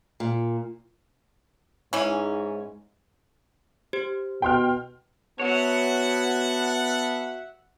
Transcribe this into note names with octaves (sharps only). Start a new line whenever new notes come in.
A#2
G#2 E3 C#4
G4 C5
B2 G5 C6 F6
B3 F#4 C#5 E5 F#5 A5